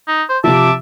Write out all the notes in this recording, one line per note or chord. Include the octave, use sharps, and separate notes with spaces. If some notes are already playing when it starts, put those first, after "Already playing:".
D#4
C5
C3 F3 E5 A5 D6